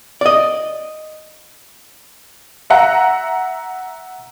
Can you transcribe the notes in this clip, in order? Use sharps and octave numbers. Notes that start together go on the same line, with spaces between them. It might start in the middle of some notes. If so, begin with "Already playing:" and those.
D5 D#5
E5 F#5 A#5